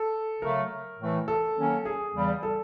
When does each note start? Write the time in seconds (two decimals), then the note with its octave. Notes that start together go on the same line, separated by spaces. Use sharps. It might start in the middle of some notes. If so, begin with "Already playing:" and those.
Already playing: A4
0.42 C#3 F#3 A3 A#4
0.99 A2 E3 A3
1.28 A4
1.56 D#3 F#3 A#3 C#4
1.85 G#4
2.14 E2 C#3 E3 G3
2.43 A4